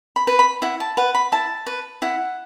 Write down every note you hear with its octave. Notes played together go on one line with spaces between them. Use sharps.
B5
B4
B5
E4 F#5
A5
B4 F#5
B5
E4 A5
B4
E4 F#5